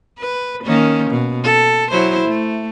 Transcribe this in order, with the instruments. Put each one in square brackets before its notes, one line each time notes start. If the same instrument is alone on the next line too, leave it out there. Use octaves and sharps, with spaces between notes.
[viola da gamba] B4
D#3 A#3 C#4
B2
A4
F#3 E4 C5
A3